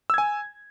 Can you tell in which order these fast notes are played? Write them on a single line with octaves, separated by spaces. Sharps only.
E6 G#6 G#5